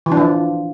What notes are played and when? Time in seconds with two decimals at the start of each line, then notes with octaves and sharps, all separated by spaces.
0.06 E3
0.12 D4
0.17 F3